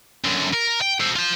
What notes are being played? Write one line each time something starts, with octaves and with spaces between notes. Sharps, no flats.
F#2 D3
A#4
G5
A4 C5
F4 C5